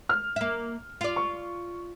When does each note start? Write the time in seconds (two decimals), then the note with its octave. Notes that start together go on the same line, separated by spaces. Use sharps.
0.09 F6
0.36 A#3 E5
1.01 F4 D5
1.16 C#6